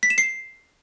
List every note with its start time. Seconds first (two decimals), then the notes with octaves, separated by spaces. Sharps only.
0.03 B6
0.10 E7
0.18 C7